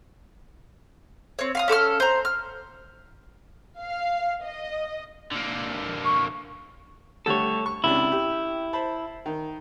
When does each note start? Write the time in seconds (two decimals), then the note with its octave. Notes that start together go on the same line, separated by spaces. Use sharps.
1.39 C4 C#5
1.55 F5 C6 D#6
1.68 C#4 A4 D6 F6
2.00 C5 A#5
2.25 F6
3.79 F5
4.42 D#5
5.31 D3 A#3
6.05 C#6
7.26 D3 G3 A3 A4 C#5
7.66 C#6
7.84 C#2 C3 D4 E4
8.12 G4
8.73 C5 A5 B5
9.26 D#3